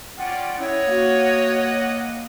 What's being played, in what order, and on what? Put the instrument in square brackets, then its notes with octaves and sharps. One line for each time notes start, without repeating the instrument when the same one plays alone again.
[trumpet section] C#4 F4 D5 [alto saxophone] F#5 [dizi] G5
[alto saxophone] C#4 [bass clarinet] E4 [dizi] C#5 [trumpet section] D#5 F#5
[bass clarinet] A#3 [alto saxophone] F#4